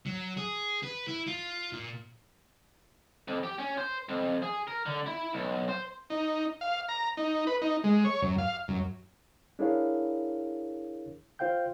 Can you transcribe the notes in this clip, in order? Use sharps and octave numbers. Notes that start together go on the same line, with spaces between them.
F#3
G#4
B4
E4
F4
A#2
F2
G4
C#4
C5
F2
G#4
A#4
D3
E4
B1
C5
D#4
F5
A#5
D#4
B4
D#4
G#3
C#5
F#2
F5
F#2
D4 E4 G#4 A#4 C#5 F5
F4 C5 F5 G5 G6